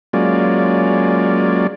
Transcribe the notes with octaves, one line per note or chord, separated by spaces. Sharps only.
F#3 G#3 A#3 C#4 F4 D5